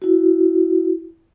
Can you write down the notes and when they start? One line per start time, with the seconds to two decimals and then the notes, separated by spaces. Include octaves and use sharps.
0.02 E4 F#4